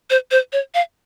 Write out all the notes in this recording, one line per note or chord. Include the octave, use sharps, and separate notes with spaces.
C5
C5
C#5
F5